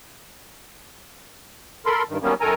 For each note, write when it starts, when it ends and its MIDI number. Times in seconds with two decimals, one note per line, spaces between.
1.86 2.03 69
1.86 2.03 70
1.86 2.03 83
1.86 2.03 84
2.09 2.18 43
2.09 2.18 51
2.23 2.34 51
2.23 2.34 54
2.23 2.34 55
2.23 2.34 58
2.23 2.34 59
2.23 2.34 61
2.41 2.54 42
2.41 2.54 51
2.41 2.54 69
2.41 2.54 70
2.41 2.54 80
2.41 2.54 82